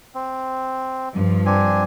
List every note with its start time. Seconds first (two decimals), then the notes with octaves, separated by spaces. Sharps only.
0.15 C4
1.12 G2 F3
1.46 C4 D4 G#5